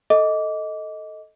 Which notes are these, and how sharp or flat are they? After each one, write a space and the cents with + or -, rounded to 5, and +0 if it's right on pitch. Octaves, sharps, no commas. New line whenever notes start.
A4 +0 D#5 +10 D6 -20